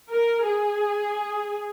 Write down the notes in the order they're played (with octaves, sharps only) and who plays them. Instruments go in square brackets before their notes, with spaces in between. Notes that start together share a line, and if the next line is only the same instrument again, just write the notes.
[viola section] A#4
G#4